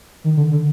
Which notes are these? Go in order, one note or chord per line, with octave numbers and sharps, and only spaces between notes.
D#3
D3
D3